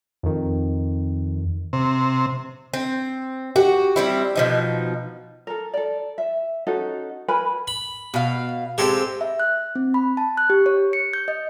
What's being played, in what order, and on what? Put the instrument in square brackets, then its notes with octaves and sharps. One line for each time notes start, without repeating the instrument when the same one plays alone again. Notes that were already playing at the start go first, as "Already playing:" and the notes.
[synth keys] F2 D#3
[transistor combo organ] C3
[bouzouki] C4
[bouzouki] F#4 [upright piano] G4
[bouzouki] G3 C4 E4
B2 F3 D#4
[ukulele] A4 A#4
A4 D5
E5
C#4 D#4 F#4 A4
A#4 B4 G#5 B5
[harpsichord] B5
[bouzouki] B2 F5
[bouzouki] G#3 A#3 C4 [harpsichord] G4 A4 C5
[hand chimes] E5
F#6
C4
B5
A5
F#6
G4
C#5
C#7
G6
D#5